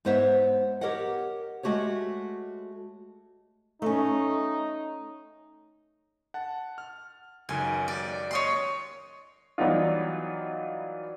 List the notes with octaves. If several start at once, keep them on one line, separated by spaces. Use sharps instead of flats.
G#2 B3 C5 C#5 E5
G4 A#4 C#5 D#5 F#5
G#3 A3 F#4 G4 C#5
A3 C#4 D#4
F#5 A5
F6
C#2 F#2 D#3 G#5
D5
C#5 D#5 C6
E3 F#3 G3 B3 D#4 F4